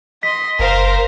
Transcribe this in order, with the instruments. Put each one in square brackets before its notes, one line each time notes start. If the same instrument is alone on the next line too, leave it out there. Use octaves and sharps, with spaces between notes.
[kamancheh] D#5 C6 [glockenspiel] B6
[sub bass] F#1 [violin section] A#4 C5 [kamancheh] F5